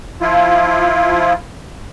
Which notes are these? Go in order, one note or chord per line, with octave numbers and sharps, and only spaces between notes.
F3 E4 F4